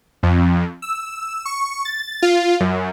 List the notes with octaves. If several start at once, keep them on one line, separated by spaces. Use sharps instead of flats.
F2
E6
C#6
A6
F4
F#2